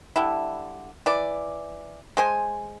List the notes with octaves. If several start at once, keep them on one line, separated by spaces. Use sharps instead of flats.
D3 G3 E4
E3 D5
G#3 C5 G#5